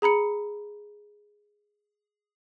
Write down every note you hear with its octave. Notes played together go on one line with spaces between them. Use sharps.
G#4 A#5 B5 C#7